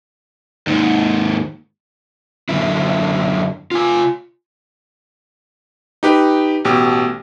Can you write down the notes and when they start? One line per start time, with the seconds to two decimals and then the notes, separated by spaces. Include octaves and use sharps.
0.67 D#2 G#2
2.49 F#2 D3 E4
3.71 F4 G#5
6.03 D#4 G4 B4
6.65 A1 B2 G4